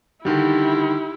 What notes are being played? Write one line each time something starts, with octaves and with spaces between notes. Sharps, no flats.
D3 D#3 G3 E4 G4